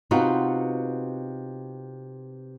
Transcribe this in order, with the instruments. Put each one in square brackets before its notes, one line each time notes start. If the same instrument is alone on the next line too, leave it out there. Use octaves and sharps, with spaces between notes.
[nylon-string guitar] C3 B3 D#4 F4 F#4